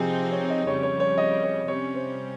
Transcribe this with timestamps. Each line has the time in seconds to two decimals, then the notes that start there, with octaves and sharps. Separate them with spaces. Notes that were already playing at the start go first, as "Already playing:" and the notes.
Already playing: C3 F3 C4 D#4 G4 G#4
0.32 C#5
0.50 D#5
0.66 F2 C#3 G3 C#5
0.83 C#5
1.00 C#5
1.18 D#5
1.43 C#5
1.68 C3 G3 C#4 C#5
1.94 C5